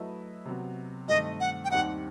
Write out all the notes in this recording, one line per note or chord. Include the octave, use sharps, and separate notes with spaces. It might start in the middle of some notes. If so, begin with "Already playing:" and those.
Already playing: F#3 A3 E4 B4 D#5
C3 F#3 B3
G2 D#3 A3 C4 D#5
F#5
G5
D#2 D#3 G3 C4 D#4 F#5